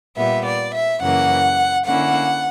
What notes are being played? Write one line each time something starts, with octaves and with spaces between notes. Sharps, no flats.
A#2 G3 B3 E5
D5
E5
F#2 C#3 E3 A#3 F#5
D3 A#3 C#4 E4 F#5